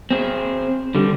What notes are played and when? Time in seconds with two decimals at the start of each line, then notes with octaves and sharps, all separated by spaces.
0.11 C4 G#4
0.95 D3 G3